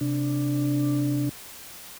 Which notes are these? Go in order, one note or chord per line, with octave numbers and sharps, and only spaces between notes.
C3 D4